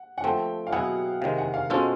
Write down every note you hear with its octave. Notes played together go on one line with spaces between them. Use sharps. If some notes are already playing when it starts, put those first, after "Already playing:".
Already playing: F#5
F#5
F3 A3 C4 G5
F5
B2 F#3 B3 E4 G#4 F#5
C3 D#3 G#3 F5
F#5
F5
B2 G#3 C#4 F4 A4 C5